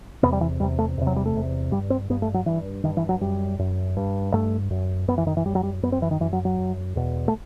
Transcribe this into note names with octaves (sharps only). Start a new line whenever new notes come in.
E2 C3 B3
G3
E3
E2 C3 G3
A3
E2 C3
F#3
G3
A3
E2 C3
G2 G3
C4
G2 B3
A3
F#3
G2 E3
G2 D#3
E3
F#3
F#2 G3
F#2
G2
G2 A3
F#2
F#2 B3
E3
D#3
E3
F#2 G3
F#3
G3
F#2 B3
C4
E3
D#3
F#2 E3
F#3
F#3
F#2
E2 B2
A3